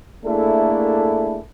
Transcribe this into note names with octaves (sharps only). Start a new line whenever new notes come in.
A3 A#3 D4 E4 G#4 A4